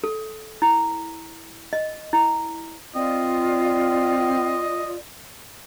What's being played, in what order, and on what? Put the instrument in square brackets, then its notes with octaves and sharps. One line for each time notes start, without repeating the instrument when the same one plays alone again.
[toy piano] A4
E4
D#5
E4
[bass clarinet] C4 [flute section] F4 D5 [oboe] D#5